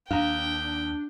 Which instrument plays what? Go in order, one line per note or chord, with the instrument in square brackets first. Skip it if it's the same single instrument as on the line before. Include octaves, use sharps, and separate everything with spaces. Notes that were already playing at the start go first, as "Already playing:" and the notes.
[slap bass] D#2 [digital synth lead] D4 [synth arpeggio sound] F5 A#5 [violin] G5